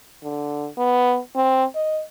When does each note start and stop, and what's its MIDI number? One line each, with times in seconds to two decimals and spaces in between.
0.23 0.68 50
0.77 1.18 59
1.35 1.64 60
1.75 2.02 75